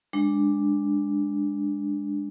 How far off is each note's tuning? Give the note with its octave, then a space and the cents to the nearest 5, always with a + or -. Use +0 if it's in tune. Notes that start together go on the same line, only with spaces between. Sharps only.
G#3 -20 D4 +0